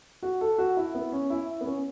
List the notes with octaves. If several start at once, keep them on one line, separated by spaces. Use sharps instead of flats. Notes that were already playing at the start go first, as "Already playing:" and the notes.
F#4
A4
F#4
E4
B3
C#4
E4
B3
C#4